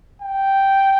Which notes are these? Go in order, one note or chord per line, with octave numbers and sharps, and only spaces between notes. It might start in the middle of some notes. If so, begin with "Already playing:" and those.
G5